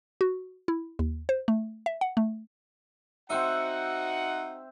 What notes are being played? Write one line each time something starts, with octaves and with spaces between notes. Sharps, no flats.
F#4
E4
D#2
C5
A3
E5
F#5
A3
C4 D#4 F#4 C5 E5 F#5